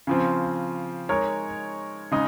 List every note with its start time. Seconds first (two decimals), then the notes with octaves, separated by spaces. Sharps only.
0.07 C#3 F3 C4
1.09 G#3 D#4 A#4 C#5
2.12 C#3 G#3 D#4